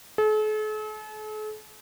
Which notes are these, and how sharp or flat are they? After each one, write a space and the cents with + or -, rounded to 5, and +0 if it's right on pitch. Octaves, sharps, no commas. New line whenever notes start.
A4 -45